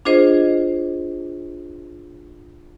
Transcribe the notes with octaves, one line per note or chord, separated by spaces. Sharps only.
D4 F4 G#4 C5 D#5